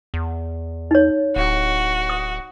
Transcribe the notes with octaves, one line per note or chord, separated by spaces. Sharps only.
E2
D#4 C#5
D1 F#4
D#6